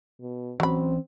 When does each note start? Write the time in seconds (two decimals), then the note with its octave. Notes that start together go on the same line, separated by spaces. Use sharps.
0.20 B2
0.60 E3 F#3 C4 C#4 B5